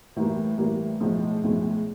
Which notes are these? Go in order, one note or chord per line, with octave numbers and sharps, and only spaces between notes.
A2 E3 G3 A#3
A2 E3 G3 A#3
B1 A2 F3 G#3
B1 A2 F3 G#3